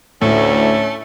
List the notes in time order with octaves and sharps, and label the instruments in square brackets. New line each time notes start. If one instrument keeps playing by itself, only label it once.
[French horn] D2 [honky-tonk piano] A2 [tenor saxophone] A3 [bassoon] C#4